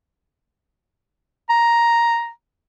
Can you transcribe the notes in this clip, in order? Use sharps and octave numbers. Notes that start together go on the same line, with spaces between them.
A#5